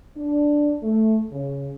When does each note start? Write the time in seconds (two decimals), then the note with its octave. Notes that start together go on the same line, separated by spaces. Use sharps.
0.16 D4
0.83 A3
1.31 C#3